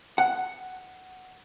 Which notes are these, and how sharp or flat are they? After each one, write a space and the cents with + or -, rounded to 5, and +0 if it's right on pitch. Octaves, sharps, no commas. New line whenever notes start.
F#5 +5